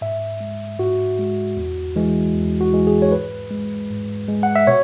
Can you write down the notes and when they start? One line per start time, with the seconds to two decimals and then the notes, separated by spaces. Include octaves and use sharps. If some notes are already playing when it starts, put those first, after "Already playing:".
0.01 G#2 E5
0.40 G#3
0.79 G#2 F#4
1.19 G#3
1.57 E2
1.96 E3 G#3
2.35 E2
2.61 F#4
2.73 E3 G#3
2.87 G#4
3.02 C#5
3.12 G#2 B4
3.51 G#3
3.90 G#2
4.28 G#3
4.43 F#5
4.56 E5
4.67 B2 C#5